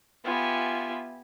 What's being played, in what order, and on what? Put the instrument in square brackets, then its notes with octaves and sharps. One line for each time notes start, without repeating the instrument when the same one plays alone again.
[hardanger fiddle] B3 E5 [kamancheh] F4 [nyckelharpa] G4 G#5